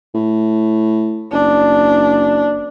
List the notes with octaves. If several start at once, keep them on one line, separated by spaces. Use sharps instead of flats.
A2
F#1 D4